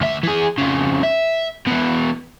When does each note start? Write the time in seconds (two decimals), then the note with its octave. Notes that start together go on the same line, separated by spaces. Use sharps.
0.01 D2 E5
0.23 E3 G#4
0.58 F2 C#3
1.03 E5
1.67 B2 E3